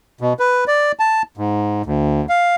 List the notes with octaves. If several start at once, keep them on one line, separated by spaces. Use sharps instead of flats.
B2
B4
D5
A5
G#2
D2
F5